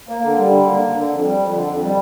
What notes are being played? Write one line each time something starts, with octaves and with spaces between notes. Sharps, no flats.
A#3
D3
G3
D3
A#3
D3
D3
F2
G3
F2
D3
F2
G3